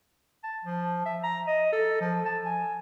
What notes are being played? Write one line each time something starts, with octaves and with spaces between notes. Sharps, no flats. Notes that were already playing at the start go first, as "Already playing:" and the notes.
A5
F3
E5
A#5
D#5
A4
F3
A5
G#5